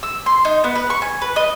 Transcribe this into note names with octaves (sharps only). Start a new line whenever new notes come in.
E6
C6
D#4
B3
B4
C#6
G#5
B4
D#5